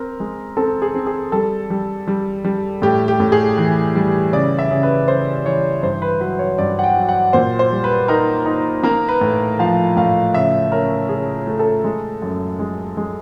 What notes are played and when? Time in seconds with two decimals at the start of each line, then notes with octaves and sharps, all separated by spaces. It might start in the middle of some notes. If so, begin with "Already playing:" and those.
Already playing: C4 A#4
0.20 G#3
0.57 C4 A4
0.82 G#4
0.94 C4
1.07 G#4
1.32 G3 A4
1.70 G3
2.08 G3
2.45 G3
2.82 A2 G4
3.08 G4
3.20 A2
3.32 G#4
3.57 E3
3.95 G3
4.33 C#3 D5
4.59 E5
4.71 C#3
4.83 B4
5.08 C#3 C5
5.45 E3 C#5
5.83 G2 C5
6.02 B4
6.20 F#3 B4
6.39 C#5
6.58 G2 D5
6.79 F#5
6.84 G5
6.96 F#3
7.09 F#5
7.33 A#2 C5
7.59 C5
7.72 G3
7.84 B4
8.08 D#4 A#4
8.46 D#4
8.83 A#3 A#4
9.08 B4
9.21 A2
9.59 F3 F5
9.97 A2 F5
10.34 C#3 E5
10.72 C#4 A#4
11.09 C#3 G#4
11.47 A3
11.59 A4
11.84 G#3
12.22 F#2
12.59 G#3
12.97 G#3